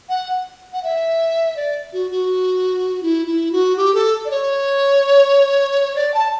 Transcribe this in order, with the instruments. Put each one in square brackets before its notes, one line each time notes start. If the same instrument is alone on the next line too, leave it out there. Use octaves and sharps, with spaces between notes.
[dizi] F#5
F#5
E5
D5
F#4
F#4
E4
E4
F#4
G4
A4
D5
C#5
D5
A5